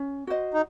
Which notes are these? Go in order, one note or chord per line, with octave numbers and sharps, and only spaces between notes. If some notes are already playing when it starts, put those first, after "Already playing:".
Already playing: C#4
F#4 C5 D#5
D#4